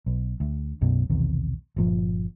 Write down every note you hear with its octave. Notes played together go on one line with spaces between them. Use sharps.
B1
D2
B1 F#2 B2
B1 E2 C3 D#3
G1 A#2 F3